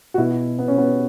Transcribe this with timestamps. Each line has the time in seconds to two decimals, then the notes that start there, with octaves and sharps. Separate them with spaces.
0.14 F#4
0.18 B2 E4
0.59 B3
0.68 C#4
0.78 B3